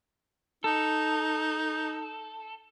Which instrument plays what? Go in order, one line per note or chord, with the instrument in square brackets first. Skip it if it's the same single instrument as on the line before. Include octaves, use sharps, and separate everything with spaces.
[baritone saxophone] D#4 [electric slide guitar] A4